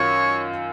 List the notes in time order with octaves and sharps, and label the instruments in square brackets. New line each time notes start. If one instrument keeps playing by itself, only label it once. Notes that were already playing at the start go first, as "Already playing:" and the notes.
Already playing: [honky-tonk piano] F#2 D#3 F4 [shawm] C#5